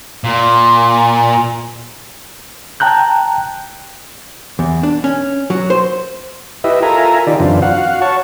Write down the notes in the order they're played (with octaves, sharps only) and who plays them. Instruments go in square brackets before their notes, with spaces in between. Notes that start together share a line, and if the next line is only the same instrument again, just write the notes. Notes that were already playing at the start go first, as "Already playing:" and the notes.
[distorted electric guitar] A#2
[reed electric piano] G5 A5 A#5 F#6 G6
[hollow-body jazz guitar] E2
D4
C#4
F#3
C5
[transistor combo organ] E4 G4 B4 D#5 E5
F4 A4 A#4 E5 G#5 A#5
D#3 D#4 F4 G4 D5
F#2 D3 E3 C4 D4 F4
F#4 F5 F#5
C#5 A5 C#6